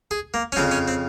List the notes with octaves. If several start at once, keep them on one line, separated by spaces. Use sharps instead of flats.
G#4
A#3
C#4
F2 C#3 F3 C4
C#4
C4